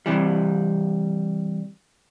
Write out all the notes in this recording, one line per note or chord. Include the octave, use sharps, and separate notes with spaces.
C3 E3 G3